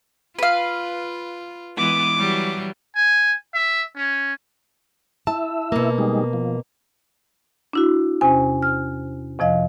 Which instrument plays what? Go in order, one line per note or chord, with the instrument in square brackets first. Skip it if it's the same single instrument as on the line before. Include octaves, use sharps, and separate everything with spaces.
[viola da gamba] F4 [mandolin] B4 F5
[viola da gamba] E3 G#3 B3 [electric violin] D6
[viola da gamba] E3 F#3 G3
[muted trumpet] G#5
E5
C#4
[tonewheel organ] E4 E5 [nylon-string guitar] A5
[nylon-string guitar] B2 A#3
[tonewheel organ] G3 G#3 D#4
F3
[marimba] D4 E4 F#4
E2 C3 C#4 C5 G#5
F6
F2 C3 F3 D#5 F5